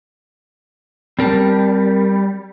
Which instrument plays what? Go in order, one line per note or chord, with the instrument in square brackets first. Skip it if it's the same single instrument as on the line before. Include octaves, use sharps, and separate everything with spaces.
[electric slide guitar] G3 [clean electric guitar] C4 A#4 A5